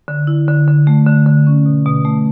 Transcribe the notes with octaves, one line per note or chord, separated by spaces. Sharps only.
D3
E4
D3
D3
A3
D3
D3
C#4
B2
B2
A3